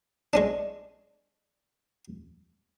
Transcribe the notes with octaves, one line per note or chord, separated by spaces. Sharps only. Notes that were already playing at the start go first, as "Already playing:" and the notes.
G#3 C#4 D4